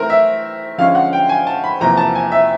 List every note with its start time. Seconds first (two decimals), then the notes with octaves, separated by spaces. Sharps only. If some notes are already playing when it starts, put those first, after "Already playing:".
Already playing: E3 A3 C4 E4 A#4 C5
0.10 E5
0.78 D3 F3 G#3 C#4 F5
0.95 F#5
1.13 G5
1.29 G#5
1.47 A5
1.64 B5
1.80 E2 C3 F3 A#3 A#5
1.97 A5
2.15 G#5
2.32 E5